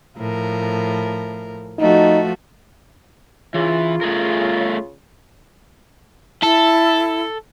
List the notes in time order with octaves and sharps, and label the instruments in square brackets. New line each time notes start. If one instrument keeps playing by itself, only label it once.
[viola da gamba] A2 F3 A#4
[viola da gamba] F3 A3 F#4 [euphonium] D#4
[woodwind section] C#3 F4 [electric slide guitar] E3
[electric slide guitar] A3 G#4 A#4
[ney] E4 [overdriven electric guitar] A4